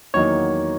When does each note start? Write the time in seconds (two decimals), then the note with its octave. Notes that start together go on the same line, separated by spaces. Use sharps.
0.14 E2 D#3 F#3 A#3 D#4 C#5